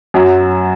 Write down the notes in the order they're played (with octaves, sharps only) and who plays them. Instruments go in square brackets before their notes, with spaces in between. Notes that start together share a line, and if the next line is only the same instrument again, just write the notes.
[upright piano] F#2 F#3